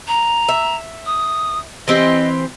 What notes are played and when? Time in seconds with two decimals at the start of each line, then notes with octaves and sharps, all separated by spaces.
0.08 A#5
0.48 E5
1.06 D#6
1.88 E3 C4 G4 D#5